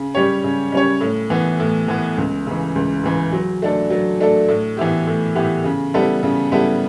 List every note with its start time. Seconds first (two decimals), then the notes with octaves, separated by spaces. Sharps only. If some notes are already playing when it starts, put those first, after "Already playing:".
Already playing: C#3
0.15 G3 C#4 G4 C#5
0.44 C#3
0.72 G3 C#4 G4 C#5
1.01 A2
1.30 E3 B3
1.60 A2
1.88 E3 B3
2.18 C#2
2.47 C#3 E3
2.76 C#2
3.04 C#3 E3
3.33 F#3
3.62 A3 D4 A4
3.90 F#3
4.20 A3 D4 A4
4.49 A2
4.77 E3 B3 E4 G4
5.07 A2
5.35 E3 B3 E4 G4
5.64 C#3
5.94 G3 B3 E4 A4
6.23 C#3
6.52 G3 B3 E4 A4